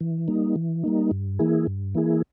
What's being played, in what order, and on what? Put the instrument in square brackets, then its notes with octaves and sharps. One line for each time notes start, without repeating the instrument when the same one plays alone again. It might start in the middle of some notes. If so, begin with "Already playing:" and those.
[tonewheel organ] E3
G3 A#3 D#4
E3
G3 A#3 D#4
G2
E3 A#3 E4 G#4
G2
E3 A#3 E4 G#4